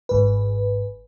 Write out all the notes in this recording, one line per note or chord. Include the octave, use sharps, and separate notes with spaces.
G#1 G#2 B4